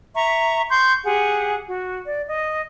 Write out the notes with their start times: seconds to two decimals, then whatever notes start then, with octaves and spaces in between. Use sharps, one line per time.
0.15 E5 A#5 C#6
0.70 C6 C#6 G6
1.04 G4 G#4 F#5
1.68 F#4
2.07 D5
2.27 D#5